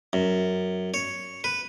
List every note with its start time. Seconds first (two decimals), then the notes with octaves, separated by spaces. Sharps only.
0.13 F#2
0.94 C#5
1.44 B4